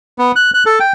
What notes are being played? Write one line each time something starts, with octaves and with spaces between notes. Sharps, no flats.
B3
F#6
F#6
A4
G5